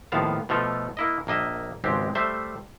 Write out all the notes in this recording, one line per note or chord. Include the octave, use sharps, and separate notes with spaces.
D#2 A2 F3 B3 F5 A5
B2 F3 A3 F4 A4
A#3 E4 D#5
A#1 A#3 D#5 E5
G#1 C#2 G#3 C4 G4
G3 A3 C5 E5